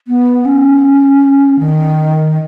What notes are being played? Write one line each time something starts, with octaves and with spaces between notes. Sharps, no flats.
B3
C#4
D#3